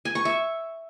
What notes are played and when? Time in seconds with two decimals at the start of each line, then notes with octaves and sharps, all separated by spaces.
0.05 G#5
0.15 C#6
0.25 E5